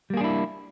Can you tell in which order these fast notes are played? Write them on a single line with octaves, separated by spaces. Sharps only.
G3 A#3 G#4 D4 E4